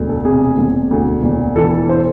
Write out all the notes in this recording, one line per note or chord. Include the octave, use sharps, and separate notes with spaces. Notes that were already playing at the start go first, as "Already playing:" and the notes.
Already playing: E1 D2
A4
C3 G#4
E1
D2
E1
E3 A4
C5